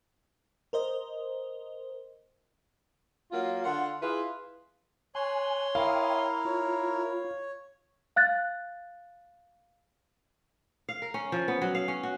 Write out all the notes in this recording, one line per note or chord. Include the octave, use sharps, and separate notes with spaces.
A#4 C5 D#5
F#3 A#3 F4
D3 F4 F#5
E4 F4 G#4 B4
C#5 G#5 C6 F#6
E4 A#4 E5 F5 G5 D#6
F4 C#5
F5 F#6 A6
F5
A#4
C#4
F3
B3
F#3
F5
C#4
F#4